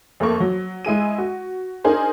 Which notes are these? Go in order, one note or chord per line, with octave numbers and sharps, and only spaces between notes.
F2 A3 A#3 C#6
F#3
G#3 E4 G#4 D#7
F#4
D4 D#4 G#4 A#4 C5